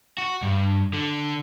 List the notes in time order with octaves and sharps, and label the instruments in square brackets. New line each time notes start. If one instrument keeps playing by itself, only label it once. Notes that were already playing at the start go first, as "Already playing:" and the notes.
[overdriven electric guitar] F#4
G2
D3